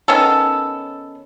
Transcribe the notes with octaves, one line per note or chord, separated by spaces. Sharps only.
D#3 B3 C#4 A4